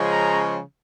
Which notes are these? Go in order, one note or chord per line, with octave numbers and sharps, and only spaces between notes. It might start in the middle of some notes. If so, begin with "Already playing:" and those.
Already playing: C#3 F3 G#3 C#4
A#5